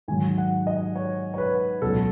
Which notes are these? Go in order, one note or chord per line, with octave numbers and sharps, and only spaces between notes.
G#2 D#3 F#3 G#5
F#5
D#5
C#5
C#5
B4
C#2 B2 F#3 A4